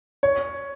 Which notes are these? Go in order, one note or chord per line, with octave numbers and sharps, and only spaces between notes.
C#5